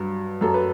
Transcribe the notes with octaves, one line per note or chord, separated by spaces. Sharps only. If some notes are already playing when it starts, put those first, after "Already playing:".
Already playing: G2 F#3
F#2 F#3 A4
B4